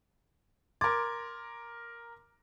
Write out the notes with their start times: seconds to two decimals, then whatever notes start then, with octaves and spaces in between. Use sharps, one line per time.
0.81 A#4 C6 D6 G#6 A6